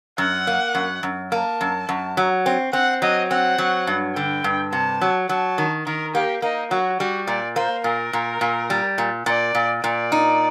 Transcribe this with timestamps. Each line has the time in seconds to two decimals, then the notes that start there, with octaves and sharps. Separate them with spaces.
0.18 F#2 F#5
0.47 A#3
0.75 F#2
1.03 F#2
1.32 A#3 A5
1.61 F#2
1.89 F#2
2.17 F#3
2.46 C4
2.73 C4 F#5
3.02 F#3 D#5
3.31 C4 F#5
3.58 F#3
3.87 G2
4.16 D3 G5
4.44 G2
4.72 C3 A5
5.01 F#3
5.29 F#3 A5
5.58 D#3
5.86 D#3 A#4
6.14 A#3 G4
6.42 A#3 D#4
6.71 F#3 F#4
6.99 G3 F#4
7.27 A#2 D5
7.56 A#3 C5
7.84 A#2 A#4
8.13 A#2
8.41 A#2
8.70 G3
8.98 A#2
9.26 A#2 D5
9.55 A#2
9.83 A#2 D5
10.12 D#4